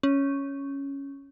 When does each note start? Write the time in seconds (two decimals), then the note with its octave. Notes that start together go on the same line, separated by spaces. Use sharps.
0.03 C#4